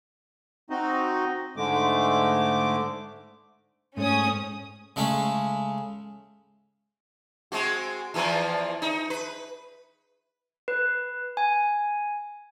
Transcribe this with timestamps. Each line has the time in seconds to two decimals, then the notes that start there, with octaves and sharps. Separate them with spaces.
0.70 C4 D#4 F#4 D#5
1.57 G#2 D3 G#3 A3 D6
3.97 G#2 G#3 A3 C#4 D#6
4.96 C#3 G#3 A3 C#4
7.52 G#3 C4 F#4
8.14 E2 E3 F3
8.82 D#4
9.10 B4
10.68 B4
11.37 G#5